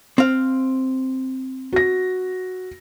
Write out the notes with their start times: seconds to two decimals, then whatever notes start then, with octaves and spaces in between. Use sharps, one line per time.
0.18 C4 F5
1.73 F#4 A#6